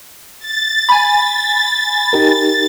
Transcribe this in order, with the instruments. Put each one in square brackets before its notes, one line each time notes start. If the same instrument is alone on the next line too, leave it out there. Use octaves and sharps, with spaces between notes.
[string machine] A6
[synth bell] G#5 B5
[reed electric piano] D#4 G4 A#4